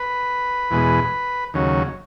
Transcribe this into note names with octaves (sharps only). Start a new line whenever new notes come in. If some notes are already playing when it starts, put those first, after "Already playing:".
Already playing: B4
E2 B2 G#3
D#2 C#3 F#3